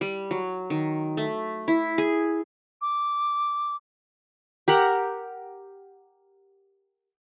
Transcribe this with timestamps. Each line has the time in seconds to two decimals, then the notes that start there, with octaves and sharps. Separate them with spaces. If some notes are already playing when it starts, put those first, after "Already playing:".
0.01 G3
0.31 F#3
0.70 D#3
1.17 A3
1.68 E4
1.98 G#4
2.82 D6
4.68 G4 A#4 F#5